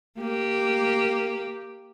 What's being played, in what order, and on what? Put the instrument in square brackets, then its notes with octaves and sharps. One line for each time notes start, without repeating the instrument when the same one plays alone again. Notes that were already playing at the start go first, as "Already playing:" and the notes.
[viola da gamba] A#3 G4